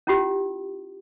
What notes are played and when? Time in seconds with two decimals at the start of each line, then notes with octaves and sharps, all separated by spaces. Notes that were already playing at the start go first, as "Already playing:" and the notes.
0.07 C#4 E4 F4 G4